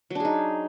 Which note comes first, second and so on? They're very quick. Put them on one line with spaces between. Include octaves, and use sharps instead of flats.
F#3 D4 G#4 D#4